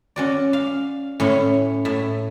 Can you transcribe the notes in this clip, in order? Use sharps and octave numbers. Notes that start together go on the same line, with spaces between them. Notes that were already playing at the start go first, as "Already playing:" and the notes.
C#4 F#4 D5
F5
A2 C#4 E4 C#5
A2 E5